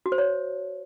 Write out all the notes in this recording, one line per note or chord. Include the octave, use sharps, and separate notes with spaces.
F#4
C5
C#5